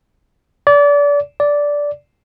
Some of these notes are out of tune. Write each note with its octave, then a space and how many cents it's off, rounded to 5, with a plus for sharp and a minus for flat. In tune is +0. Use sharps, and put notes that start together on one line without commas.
D5 -30
D5 -10